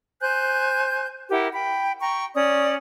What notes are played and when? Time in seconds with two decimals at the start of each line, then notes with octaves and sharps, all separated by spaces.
0.20 C5 G#5 F#6 G6
1.29 E4 G4 A#4 F#5
1.53 G5 B5
2.01 G5 A#5 C#6
2.35 C#4 D5 D#6